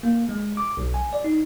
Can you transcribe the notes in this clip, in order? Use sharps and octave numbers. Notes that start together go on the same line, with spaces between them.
A#3
G#3
D6
B1
G#5
D5
D#4